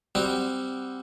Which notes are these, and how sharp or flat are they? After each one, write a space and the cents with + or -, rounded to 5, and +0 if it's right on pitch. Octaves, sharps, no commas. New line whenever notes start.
G3 +0 C4 -10 F#4 +0